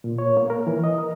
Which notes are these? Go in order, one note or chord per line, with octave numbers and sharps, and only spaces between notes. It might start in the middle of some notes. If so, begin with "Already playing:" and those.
A#2
C#5
A#3
A#4
E3
D#5
A#4